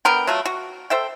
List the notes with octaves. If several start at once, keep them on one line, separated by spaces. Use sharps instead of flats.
D3 B3 A#4 G5
F#3 A3 F4
F#4
A4 C5 E5 G5